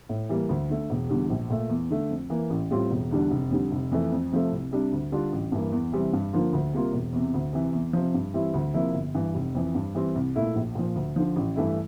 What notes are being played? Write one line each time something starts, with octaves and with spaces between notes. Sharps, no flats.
A2
E3 G3 A#3
D2
D3 A3
E1
E2 D3 G3
A#1
A#2 A3
E2
D3 A3
F2
E3 A#3
A1
A2 G3 C4 F4
E1
E2 D3 G3 D4
F1
F2 D3 G3
F1
F2 E3 A3
F2
C3 F3 A3
C2
C3 G3 D4
D2
D3 G3 D4 F4
A1
G2 E3 A#3
E2
C3 E3 G3 C4
G2
D3 F3 A#3 F4
D2
C3 G3 A#3 F4
E1
E2 C3
D2
C3 E3
E2
C3 F3
G2
E3 G3 C4 E4
D2
C3 F3 A#3 E4
G1
G2 E3
F1
F2 E3
G2
E3 G3 C4
C2
A#2 A3 E4
A#1
A#2 F3
D2
D3 F3
A1
G2 E3 A3 E4